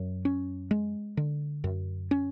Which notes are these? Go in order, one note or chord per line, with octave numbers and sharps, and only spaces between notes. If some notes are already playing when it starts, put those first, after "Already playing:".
Already playing: F#2
C#4
G#3
D3
F#2
C#4